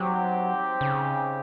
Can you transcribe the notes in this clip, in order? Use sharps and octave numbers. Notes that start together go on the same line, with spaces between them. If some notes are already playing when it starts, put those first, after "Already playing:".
Already playing: F#3 C4 D#4 G4 C5
C#3